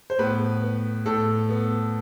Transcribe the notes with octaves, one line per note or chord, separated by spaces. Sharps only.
C5
A2 B3 B4
B3
A2 A4
B3